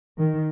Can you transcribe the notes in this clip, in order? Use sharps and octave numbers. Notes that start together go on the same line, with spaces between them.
D#3